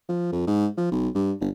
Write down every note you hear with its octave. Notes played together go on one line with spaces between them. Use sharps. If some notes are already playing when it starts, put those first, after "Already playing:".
F3
F2
G#2
F3
B1
G2
G1